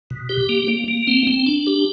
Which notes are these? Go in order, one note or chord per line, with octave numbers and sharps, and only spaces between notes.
B2
G4
A#3
A#3
A#3
C4
C4
D4
G4